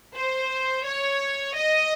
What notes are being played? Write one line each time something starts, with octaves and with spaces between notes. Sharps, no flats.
C5
C#5
D#5